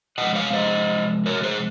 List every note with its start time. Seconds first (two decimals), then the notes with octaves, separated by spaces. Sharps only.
0.18 C3 F3 G#3 D#5 F#5
0.35 C#5 F5
0.53 C5 D#5
1.26 A#4 C#5
1.43 G#4 C5